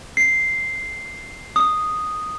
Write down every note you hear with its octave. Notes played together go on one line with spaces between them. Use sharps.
C7
D#6